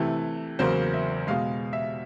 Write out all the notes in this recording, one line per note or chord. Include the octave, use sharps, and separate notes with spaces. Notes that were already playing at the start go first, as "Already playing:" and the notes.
Already playing: C3 E3 A3
E2 C#3 F#3 A#3 C5
E5
B2 G#3 F5
E5